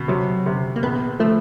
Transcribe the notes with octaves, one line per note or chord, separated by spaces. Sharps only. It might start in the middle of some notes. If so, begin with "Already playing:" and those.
Already playing: B2
C3 F#3
C3
A#3
A#1 B3
F3 A3